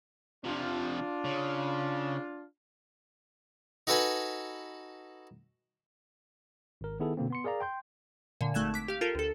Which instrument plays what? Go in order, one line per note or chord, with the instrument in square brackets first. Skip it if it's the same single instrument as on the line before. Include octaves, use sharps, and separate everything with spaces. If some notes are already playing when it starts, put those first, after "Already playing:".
[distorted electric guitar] C3 F3 [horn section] D4 F4
[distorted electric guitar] C#3
[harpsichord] D#4 F#4 A4 B4 F#5 G#5
[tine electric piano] G#1 A#4
D#3 B3 E4 G#4 A4
B2 D3 A#3 C4
B3 C6 C#7
G#4 A#4 D5 F5 A#5
G5 C6 G6
[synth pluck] A#2 D3
G#1 A3 F#6 G#6 E7
D6 B6
G4 F5
F4 G4 A4 A#4
D2 A4